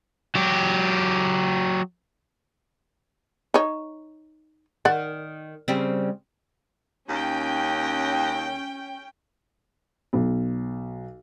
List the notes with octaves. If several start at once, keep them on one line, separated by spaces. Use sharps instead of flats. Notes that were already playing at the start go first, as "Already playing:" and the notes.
F#3 G4
D#4 C#5
D#3 D5 F#5
C#3 G3 C4
D#2 C#4 G5
B1